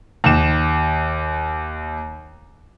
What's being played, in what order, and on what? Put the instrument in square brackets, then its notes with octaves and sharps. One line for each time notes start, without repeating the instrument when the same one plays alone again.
[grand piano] D#2 E7